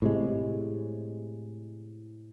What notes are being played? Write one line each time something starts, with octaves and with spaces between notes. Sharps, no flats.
A2 C3 G#3